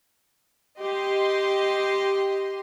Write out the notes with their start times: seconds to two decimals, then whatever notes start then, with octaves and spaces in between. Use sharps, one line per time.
0.79 G4 D#5 C6